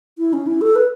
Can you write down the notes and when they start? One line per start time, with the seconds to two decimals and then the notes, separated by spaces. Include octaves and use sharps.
0.18 E4
0.33 C#4
0.47 E4
0.61 A4
0.76 B4